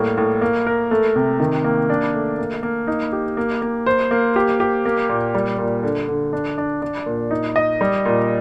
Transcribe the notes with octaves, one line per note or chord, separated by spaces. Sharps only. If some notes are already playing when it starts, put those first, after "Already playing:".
Already playing: A2 G3 A#3
A2
A#3
A#4
A3
C3
D#3
A#3
D4
A3
A#3
A#3
D#4
G4
A#3
A#3
C5
A#3
G4
G4
A#3
A#2
G3
A#2
D3
D3
D4
D4
D4
A#2
D#4
D#5
G3
A#2